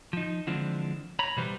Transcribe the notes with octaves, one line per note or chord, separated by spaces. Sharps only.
F3 D#4
D3 E3 F3 G#3 C4 D4
C#5 A#5 B5
B2 E3 G3 B4 C5